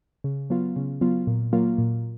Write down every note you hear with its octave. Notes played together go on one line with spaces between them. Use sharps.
C#3
F#3 B3 F4
C#3
F#3 B3 F4
A#2
F#3 A#3 F4
A#2